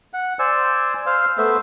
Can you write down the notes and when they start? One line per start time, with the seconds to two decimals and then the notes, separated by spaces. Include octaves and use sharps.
0.13 F#5
0.39 C5 D5 G#5 E6
1.06 C5 F5
1.38 A3 B3 C5 E5